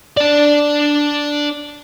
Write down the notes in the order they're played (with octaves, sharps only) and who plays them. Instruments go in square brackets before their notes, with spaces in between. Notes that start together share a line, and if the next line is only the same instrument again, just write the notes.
[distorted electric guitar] D4 D5